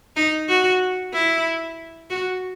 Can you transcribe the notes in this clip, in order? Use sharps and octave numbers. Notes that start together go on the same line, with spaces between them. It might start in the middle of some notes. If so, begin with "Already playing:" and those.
D#4
F#4
E4
F#4